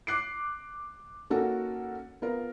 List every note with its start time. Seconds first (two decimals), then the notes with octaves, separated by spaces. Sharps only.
0.07 D6 F#6 C7 D7
1.30 A#3 C#4 D#4 F#4 A4 A#4
2.22 B3 F4 A#4